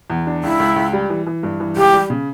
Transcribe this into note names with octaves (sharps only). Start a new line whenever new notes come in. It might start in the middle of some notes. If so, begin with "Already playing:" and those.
E2
D4
C#2 E4
C#2
C#2
G3
E3
E3
G2
E3
C#2 G4
G3
C#3